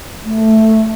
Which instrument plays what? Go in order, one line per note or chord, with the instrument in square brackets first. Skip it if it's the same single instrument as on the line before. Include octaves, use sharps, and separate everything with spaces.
[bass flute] A3